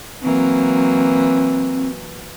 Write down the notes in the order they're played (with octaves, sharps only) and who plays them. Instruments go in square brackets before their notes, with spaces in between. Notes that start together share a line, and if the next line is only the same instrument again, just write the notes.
[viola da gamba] E3 F#3 A#3 [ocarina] C4